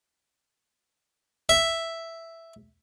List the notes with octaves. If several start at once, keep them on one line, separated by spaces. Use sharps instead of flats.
E5